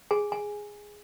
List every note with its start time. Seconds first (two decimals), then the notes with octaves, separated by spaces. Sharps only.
0.11 G#4 G#5
0.32 G#5